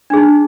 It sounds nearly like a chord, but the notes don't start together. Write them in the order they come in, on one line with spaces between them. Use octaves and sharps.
D4 G#4 D#4